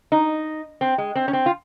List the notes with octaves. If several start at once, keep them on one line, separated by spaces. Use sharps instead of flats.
D#4
C4
G#3
C4
C#4
C4
F4